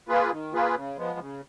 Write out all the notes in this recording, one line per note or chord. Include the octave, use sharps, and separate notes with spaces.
A#3 F4 G#4 B4
D#3
A#3 F4 G#4 B4
C#3
F3 G#3 B3
C#3